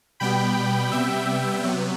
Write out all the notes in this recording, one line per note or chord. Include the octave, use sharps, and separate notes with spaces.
B2 G3 B3 G5 B5
C3 G3 B3 E5 G5
C3 F#3 B3